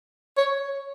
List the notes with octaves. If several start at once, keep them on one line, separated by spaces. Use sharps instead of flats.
C#5